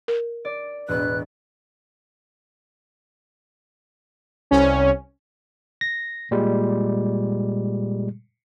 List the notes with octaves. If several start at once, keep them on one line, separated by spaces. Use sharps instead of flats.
A#4
D5
E1 A2 B3 B4 F#6
C2 C#4
A#6
A#2 G3 G#3